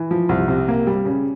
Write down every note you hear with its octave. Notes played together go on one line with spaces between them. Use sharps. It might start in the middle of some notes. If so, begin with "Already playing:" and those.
Already playing: E3
F3
C2
C3
A#3
G3
C#3